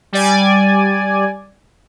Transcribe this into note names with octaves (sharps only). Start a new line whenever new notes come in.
G3 D5 G#5